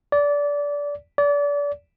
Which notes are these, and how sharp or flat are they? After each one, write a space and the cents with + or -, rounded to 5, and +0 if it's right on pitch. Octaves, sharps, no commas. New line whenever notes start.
D5 -20
D5 -30